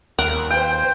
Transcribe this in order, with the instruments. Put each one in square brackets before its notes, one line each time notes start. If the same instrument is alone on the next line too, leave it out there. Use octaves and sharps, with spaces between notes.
[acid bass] D#2 [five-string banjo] A#4 F#5
[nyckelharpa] B4 C5 [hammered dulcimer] G5